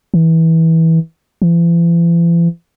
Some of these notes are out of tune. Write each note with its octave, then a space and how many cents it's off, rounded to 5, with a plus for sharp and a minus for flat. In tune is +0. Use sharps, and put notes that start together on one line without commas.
E3 -20
E3 +45